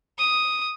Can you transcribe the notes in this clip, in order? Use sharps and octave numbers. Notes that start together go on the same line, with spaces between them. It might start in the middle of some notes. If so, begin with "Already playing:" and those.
D#6